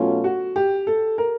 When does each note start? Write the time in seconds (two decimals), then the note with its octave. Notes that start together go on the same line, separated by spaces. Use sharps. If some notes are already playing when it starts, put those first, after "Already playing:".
Already playing: B2 F#3 A3 C#4 F4
0.24 F#4
0.56 G4
0.87 A4
1.18 A#4